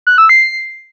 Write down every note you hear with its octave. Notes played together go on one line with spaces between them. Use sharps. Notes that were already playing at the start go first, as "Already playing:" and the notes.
F#6
E6
C7